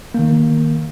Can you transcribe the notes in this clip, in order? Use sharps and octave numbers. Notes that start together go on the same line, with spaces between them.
D#3 A#3